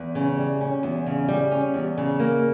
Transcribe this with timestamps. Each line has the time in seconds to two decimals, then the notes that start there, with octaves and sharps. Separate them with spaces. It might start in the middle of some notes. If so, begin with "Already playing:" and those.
Already playing: E2
0.15 C#3
0.37 G3
0.61 C#4
0.83 E2
1.06 C#3
1.28 G3
1.51 C#4
1.74 E2
1.97 C#3
2.19 A#3